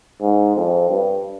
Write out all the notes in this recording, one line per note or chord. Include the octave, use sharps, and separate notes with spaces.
G#2
F2
G2